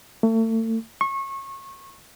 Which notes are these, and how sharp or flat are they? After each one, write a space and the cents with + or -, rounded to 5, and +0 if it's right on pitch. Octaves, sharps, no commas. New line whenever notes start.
A3 +35
C#6 -25